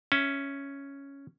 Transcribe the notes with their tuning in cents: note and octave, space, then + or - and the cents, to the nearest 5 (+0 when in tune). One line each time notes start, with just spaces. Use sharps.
C#4 +0 E5 +0